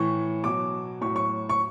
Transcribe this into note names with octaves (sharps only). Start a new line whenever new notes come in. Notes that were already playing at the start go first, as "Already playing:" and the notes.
Already playing: A2 E3 C#6
B2 F#3 D6
A2 F#3 C#6
C#6
C#6